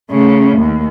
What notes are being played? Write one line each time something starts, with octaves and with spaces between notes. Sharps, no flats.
C#3 A3
D#2